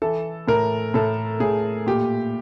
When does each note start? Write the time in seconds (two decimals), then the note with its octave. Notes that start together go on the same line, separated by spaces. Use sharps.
0.02 E3 A4
0.48 A2 A#4
0.94 A2 A4
1.40 A2 G#4
1.87 A#2 G4